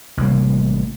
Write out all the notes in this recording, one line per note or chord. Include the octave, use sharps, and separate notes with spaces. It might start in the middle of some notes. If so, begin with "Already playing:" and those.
A1 C3 G3 A#3